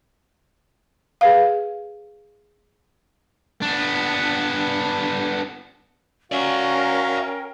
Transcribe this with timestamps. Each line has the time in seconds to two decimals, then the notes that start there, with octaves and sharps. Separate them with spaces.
1.21 G#4 B4 F5
3.62 B3 D4
6.32 C#4 F#4 A#4 D5 E5 F5 G5